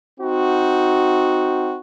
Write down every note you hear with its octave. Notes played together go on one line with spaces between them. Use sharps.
C4 D#4 F#4